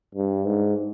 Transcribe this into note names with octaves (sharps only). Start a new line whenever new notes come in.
G2
G#2